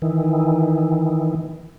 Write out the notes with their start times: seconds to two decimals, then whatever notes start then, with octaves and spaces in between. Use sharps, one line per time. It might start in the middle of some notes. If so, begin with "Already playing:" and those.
0.02 D#3 E3